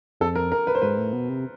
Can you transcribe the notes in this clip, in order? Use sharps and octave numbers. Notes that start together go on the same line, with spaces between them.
F2 A4
A#4
A#4
B4
C5
G#2 B4
A2
B2
C3